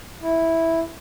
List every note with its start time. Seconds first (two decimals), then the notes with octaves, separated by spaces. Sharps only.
0.22 E4